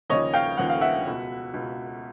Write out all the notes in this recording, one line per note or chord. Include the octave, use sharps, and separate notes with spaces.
D#2 C#3 F3 C#5 D#5
F5 G5
D#2 C#3 F3 F#5
F5
E5 F#5
C#2 B2
C#2 B2